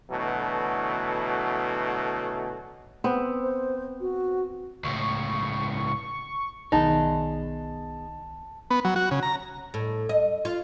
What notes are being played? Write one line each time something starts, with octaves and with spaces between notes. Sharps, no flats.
B2 D3 E3 F#3 A3
B3 C4
C5
F#4
C#2 A2 C#6
B1 D#3 B3 D#4 G#4 G#5 A5
B3
F#3
F#4
C#3
A#5
A2
D#5
F4